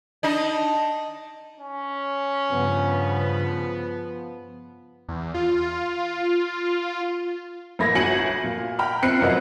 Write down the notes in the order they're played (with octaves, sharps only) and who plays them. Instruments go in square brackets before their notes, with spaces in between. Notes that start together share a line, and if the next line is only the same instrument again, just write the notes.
[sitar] D4 D#4 D#5
[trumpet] C#4
[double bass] G2 C#3 [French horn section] F3 B3
[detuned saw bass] E2
F4
[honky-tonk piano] A1 A3 A#3 B5 G#6 A#6
G1 F#4 G#5 C#7 F#7
A#2
G5 A#5 B5 F6
A#1 C4 F#6 C7 C#7
G#1 C3 F#3 B3 D#5 F#5